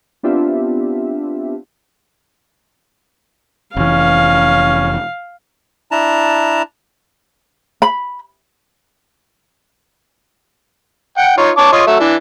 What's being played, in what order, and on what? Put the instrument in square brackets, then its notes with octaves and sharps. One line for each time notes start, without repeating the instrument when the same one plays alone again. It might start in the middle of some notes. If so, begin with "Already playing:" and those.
[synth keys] B3 C4 D4 F4 G4 E5
[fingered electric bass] F1 E3 [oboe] C#4 [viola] F5
[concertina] D4 E4 A5 A#5
[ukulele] B5
[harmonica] F#5 G5
D#4 F4 C#5
C#5 A5 D6
F4 C#5 D#5
F#3 A3 E5
E3 D4